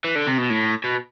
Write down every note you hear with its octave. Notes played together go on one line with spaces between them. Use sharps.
E3
D3
C3
B2
A2
B2